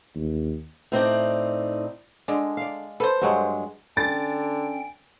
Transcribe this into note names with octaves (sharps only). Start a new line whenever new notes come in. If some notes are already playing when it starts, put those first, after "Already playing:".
D#2
A2 C4 D#4 D5
D3 G#3 D4
D5 F5
A4 B4 C5
G2 F#3 G#3
D3 C#4 G5 A6